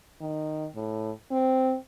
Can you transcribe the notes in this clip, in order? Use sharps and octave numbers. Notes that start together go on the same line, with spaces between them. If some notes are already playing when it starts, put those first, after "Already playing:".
D#3
A2
C4